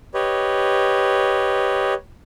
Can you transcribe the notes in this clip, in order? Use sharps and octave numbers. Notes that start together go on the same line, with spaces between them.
G4 B4 C#5 D#5